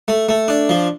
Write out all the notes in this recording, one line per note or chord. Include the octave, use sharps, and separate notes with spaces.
A3
A3
D4
F3